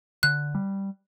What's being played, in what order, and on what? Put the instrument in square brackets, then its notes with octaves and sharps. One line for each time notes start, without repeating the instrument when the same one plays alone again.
[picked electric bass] D3 [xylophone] F#6
[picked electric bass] G3